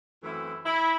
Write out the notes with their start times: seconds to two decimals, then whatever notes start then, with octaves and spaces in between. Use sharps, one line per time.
0.22 F#2 E3 A3 C4 E4
0.65 E4